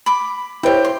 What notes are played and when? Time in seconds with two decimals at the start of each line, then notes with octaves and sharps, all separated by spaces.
0.06 B5 D6
0.63 E4 G4 C5 C#5 G5
0.84 C6